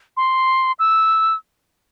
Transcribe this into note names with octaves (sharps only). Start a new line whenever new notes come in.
C6
E6